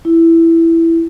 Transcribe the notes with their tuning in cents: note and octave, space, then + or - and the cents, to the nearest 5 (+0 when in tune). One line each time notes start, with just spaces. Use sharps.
E4 +5